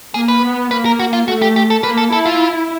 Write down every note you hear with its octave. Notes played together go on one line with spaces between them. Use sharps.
A#3 G#4
B4
B3
A#3 B4
A#4
F#4
F4
A3 F#4
G4
G4
A4
A#3 B4
A4
E4 A4
F4